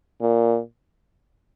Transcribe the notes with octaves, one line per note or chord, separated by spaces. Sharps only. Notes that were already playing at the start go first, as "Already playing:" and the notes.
A#2